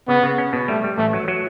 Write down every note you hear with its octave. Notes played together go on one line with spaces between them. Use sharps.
C#3 B3
C#3
C#4
B2
G3 A3
G3
A1 A3
F#3
F#3